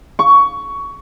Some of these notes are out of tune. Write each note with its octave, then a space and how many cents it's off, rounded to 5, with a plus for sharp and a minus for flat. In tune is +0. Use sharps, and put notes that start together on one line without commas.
C#6 +15